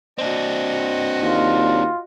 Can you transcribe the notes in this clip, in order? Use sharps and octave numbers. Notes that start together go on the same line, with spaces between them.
C4 D4 F#4 D#5
D#2 F4